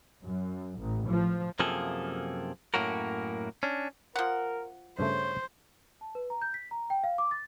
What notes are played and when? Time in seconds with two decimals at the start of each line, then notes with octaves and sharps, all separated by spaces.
0.24 F#2
0.79 A1
1.10 F3
1.59 F#2 C3 F3 A#3 G#4 A4
2.74 F#2 A2 A#3 C#4 F#4 A#4
3.63 C#4 D4
4.16 F3 A#4 F#5
4.99 G2 C#3 A3 C5 C#5
6.01 A5
6.15 B4
6.30 A#5
6.42 G6
6.54 B6
6.71 A#5
6.90 G5
7.04 F5
7.18 D6
7.31 A6